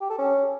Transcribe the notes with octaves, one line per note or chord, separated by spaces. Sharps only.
G4
A4
C#4